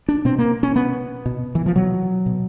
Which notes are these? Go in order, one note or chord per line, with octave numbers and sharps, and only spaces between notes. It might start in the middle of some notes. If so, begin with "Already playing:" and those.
D4
B2 C4
A#3
C#4
B2 B3
B2
E3
F3
B2 F#3
B2